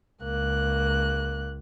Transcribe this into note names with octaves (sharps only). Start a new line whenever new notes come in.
C#2 A#3 F#6